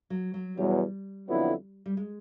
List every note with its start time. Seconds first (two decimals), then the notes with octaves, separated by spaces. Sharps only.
0.10 F#3
0.34 F#3
0.57 E2 B2 F#3 G3
1.27 F2 D3 F#3 B3 E4
1.86 G3
1.97 G#3